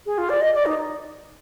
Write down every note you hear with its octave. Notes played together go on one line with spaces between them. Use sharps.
G#4
F4
D5
D#5
D5
D#4